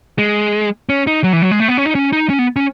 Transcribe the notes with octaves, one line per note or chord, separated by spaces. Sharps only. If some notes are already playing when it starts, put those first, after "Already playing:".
G#3
C#4
D#4
F#3
E3
F#3
G#3
A3
B3
C#4
D#4
C#4
D#4
C#4
B3
C#4